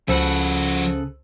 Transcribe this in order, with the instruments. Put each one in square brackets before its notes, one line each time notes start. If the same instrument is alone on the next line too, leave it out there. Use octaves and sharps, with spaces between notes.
[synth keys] C#2 C5 E6 [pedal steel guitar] C#3 A4 B4 [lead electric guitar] F3 F#4